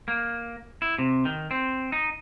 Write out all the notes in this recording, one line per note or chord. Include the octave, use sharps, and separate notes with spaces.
A#3
E4
C3
D#3
C4
D#4